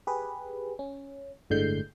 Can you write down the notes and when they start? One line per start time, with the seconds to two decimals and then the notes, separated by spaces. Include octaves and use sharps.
0.07 G4 G#4 B4
0.79 C#4
1.50 G1 A2 D3 G#3 G6 C7